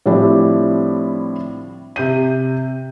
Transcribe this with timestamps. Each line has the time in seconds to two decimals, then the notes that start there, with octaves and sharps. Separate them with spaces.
0.06 A2 F3 G3 C4 D4 E4
1.96 C3 G6 D#7